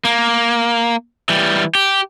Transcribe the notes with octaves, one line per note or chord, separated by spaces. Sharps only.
A#3
E3 G3
G4